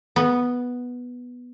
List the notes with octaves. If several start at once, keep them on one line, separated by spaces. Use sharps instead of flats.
B3